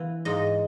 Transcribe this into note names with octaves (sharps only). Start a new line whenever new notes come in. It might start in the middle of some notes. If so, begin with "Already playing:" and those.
Already playing: E3 B3
G#2 D#5